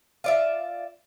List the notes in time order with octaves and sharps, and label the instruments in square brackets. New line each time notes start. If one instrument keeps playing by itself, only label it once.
[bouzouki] F4 D5 E5